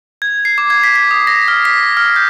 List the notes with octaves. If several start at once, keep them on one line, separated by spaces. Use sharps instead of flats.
G#6
C7
D6
G#6
B6
B6
D#6
A#6
F6
B6
F6
G6